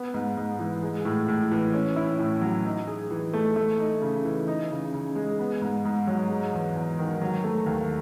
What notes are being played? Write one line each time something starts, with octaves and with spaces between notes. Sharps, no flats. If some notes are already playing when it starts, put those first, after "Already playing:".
Already playing: B3
G#2
G#2
E3
G#3
A2
A2
E3
C#4
E4
A2
F#3
D#4
G#4
E3
A3
A3
D#4
C#3
E3
D#4
C#3
C#3
G#3
B3
G#2
G#2
F#3
G#3
E2
E2
D#3
F#3
A3
D#2